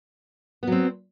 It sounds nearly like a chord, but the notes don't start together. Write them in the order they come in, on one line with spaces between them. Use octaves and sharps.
B3 F#3 C4